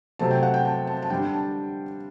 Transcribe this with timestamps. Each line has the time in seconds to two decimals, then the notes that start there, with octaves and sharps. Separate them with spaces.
0.19 C3 F#3 A3 C4 A5
0.31 G5
0.43 F#5
0.54 G5
0.65 A5
0.87 A5
1.02 A5
1.10 D3 G3 D4 G5
1.33 A5